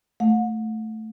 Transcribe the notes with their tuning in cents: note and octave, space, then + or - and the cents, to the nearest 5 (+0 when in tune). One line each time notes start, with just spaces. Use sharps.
A3 +0 F#5 -40